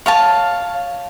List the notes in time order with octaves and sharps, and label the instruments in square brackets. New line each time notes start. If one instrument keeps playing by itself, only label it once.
[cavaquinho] C#5 F5 A5